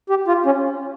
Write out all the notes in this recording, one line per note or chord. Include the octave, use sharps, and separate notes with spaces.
G4
F4
C#4